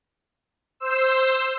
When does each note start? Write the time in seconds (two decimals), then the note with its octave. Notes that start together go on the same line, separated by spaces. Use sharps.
0.80 C5 E6